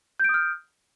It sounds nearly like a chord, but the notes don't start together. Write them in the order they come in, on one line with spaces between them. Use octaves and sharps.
G6 D7 D#6 F6